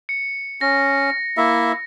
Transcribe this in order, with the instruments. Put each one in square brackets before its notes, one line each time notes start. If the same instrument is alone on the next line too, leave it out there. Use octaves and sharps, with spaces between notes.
[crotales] C#7
[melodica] C#4 [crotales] A#6
[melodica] A#3 E4 E5